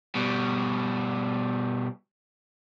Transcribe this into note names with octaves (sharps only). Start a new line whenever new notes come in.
B2 G3